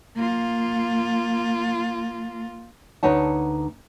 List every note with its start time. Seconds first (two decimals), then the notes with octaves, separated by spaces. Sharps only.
0.16 A#3 F4
3.03 D2 D#4 B4 C#5 F#5 A5